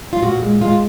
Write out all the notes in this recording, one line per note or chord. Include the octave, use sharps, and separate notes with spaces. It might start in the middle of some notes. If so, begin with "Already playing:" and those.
F4
A#2 F#4
G#3
G#3 F4